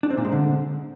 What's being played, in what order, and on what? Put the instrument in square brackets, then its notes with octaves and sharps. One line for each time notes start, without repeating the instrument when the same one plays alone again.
[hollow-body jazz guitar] D4
C4
A#2
G#3
D3